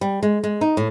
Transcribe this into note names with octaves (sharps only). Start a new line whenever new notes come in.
G3
G#3
G#3
D#4
A2